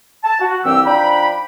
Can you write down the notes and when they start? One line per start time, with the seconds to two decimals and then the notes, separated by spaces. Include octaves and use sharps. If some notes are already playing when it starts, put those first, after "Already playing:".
0.24 A5
0.41 F#4
0.64 C2 G2 E3 C4 G4 E6
0.85 F3 D4 D#4 G5 B5